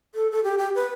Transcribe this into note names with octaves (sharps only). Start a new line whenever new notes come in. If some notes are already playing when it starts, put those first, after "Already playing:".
A4
A4
G4
G4
B4